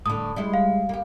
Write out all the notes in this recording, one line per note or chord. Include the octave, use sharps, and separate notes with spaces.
A2 D3 D#6
G3 G#3 E4
F5
A#3 G4